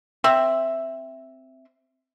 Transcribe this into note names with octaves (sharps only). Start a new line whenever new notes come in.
C4 E5